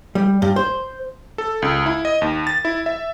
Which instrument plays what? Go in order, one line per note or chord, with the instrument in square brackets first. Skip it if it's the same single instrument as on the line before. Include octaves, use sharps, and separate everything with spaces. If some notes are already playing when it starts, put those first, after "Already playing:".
[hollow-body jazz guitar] G3
G2
C5
[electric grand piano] A4
C#2
E4
D#5
D#2
A6
E4
E5